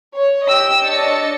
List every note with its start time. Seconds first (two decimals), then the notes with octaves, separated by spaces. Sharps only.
0.16 C#5
0.46 G4 D#5 G5 E6
0.85 D4 C#5 D#5 A6 C#7